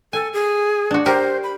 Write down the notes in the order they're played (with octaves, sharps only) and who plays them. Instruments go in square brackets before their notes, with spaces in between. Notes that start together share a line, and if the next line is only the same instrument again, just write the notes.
[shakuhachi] A4 [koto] G#5
[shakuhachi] G#4
[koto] D4 F#4
[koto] G4 A#4 [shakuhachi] C5
[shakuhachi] B5